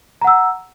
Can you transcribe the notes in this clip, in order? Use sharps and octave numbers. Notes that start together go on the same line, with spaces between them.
F#5 A#5 E6